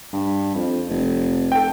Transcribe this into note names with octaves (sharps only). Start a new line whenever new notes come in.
G2
F2
F1
A4 G5